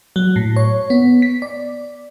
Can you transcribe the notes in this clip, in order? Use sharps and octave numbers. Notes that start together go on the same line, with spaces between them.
F#3
A2
C#5
B3
B6
D5